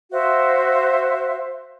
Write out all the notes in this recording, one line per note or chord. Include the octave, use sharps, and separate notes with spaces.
F#4 C5 E5 F5